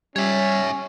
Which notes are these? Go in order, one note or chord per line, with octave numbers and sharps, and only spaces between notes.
G3 C#4 C#5 E5